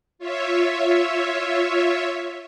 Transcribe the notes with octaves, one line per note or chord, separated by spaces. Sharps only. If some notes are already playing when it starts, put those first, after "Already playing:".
F4 C#5 E5